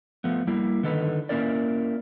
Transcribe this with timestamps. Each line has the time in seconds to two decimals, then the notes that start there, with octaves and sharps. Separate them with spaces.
0.24 F3 A3 B3
0.47 G3 A#3 E4
0.83 D3 D#3 D#4 A4 B4
1.29 A#3 C#4 E4 A#4 D5